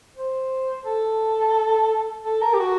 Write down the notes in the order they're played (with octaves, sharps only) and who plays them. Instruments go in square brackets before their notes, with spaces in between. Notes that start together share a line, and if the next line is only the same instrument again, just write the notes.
[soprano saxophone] C5
A4
A4
A#4
G4
F#4